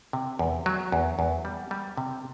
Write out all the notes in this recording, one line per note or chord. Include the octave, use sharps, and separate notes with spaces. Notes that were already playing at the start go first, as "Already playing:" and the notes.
C3
E2
F#3
E2
E2
G3
G3
C3